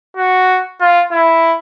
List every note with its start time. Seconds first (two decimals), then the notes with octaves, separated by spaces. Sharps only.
0.17 F#4
0.81 F4
1.12 E4